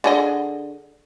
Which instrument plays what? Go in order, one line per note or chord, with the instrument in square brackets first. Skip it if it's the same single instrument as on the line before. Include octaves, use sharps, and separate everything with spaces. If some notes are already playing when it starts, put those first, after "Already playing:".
[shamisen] D3 G#4 D#5